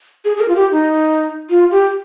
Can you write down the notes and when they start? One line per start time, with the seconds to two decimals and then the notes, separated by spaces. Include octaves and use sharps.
0.25 G#4
0.36 G#4
0.41 A#4
0.48 F4
0.56 G4
0.72 D#4
1.50 F4
1.71 G4